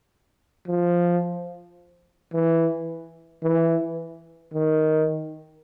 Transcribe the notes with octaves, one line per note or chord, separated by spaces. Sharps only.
F3
E3
E3
D#3